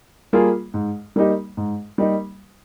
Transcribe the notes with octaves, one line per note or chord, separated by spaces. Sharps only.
G3 A#3 F4 G#4
G#2
G3 A#3 D#4 G4
G#2
G3 A#3 D#4 G4